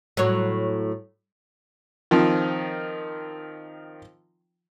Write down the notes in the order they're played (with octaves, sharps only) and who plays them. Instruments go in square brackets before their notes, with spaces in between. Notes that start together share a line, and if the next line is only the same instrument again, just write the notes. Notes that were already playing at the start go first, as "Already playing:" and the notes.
[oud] A2 F#3 C#5
[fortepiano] D#3 F3 C4